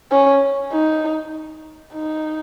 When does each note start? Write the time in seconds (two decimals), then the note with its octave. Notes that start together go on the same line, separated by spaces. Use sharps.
0.12 C#4
0.72 D#4
1.94 D#4